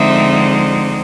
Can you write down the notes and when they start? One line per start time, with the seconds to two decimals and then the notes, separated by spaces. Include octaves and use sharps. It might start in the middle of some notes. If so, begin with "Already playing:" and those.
Already playing: D3 F3 G#3 C4 D#4 E5